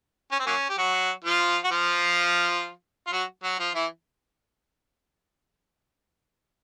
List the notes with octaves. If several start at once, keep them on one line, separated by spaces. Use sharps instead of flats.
C#4
C4
F#3 A#3 C#4
G4
F#3 F#4
F3 F4
F#4
F3 F4
F4
F#3 F#4
F#3 F#4
F3 F4
E3 E4